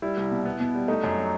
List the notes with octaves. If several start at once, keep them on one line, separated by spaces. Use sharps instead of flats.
G3 E4
C2
B2
B3
B2
G3
A3 D#4
F#2
F#3